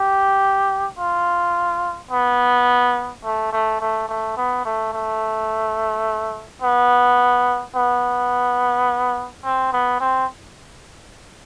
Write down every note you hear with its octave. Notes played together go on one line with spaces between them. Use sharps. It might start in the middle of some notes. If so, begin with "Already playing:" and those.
Already playing: G4
F4
B3
A3
A3
A3
A3
B3
A3
A3
B3
B3
C4
B3
C4